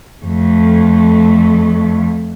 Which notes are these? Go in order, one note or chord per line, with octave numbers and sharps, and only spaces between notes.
F2 A3